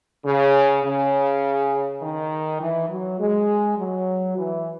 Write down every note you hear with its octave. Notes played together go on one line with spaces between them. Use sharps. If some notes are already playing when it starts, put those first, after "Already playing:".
C#3
C#3
D#3
E3
F#3
G#3
F#3
E3